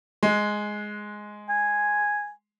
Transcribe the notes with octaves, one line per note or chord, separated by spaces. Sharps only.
G#3
G#5